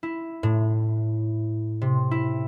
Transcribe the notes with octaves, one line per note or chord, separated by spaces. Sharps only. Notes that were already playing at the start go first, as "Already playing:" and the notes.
E4
A2
C3
E4